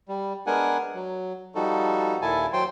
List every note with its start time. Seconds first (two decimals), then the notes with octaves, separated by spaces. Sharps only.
0.08 G3
0.47 G#3 B3 D4 A#4 F#5 G#5
0.94 F#3
1.55 F3 G3 D#4 F#4 A4
2.22 D#2 A#2 E4 A4 G#5 A5
2.53 F#3 C5 G5 C6